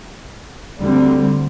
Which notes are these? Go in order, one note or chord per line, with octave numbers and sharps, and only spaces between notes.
D2 D3 G3 C4